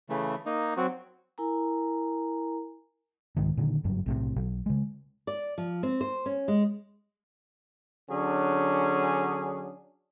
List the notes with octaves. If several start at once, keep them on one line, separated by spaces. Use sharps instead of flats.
C#3 E3 A3
A#3 D#4
F#3 C4 F#4
E4 A#4 G#5 A#5
C2 G#2 D#3
A#2 D3 D#3
F#1 G2 F#3
B1 A2 C3
B1
C#3 G#3
D5
F3
C4
C5
C#4
G#3
D3 F#3 C#4 D4 G#4